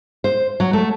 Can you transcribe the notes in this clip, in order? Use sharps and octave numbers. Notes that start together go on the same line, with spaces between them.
C5
F#3
A3